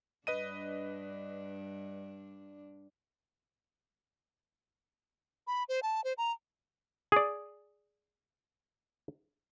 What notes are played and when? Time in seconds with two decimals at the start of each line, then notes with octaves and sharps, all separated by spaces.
0.27 G2 D4 B4 D#5 D#7
5.47 B5
5.69 C5
5.83 A5
6.04 C5
6.18 A#5
7.12 G#4 D5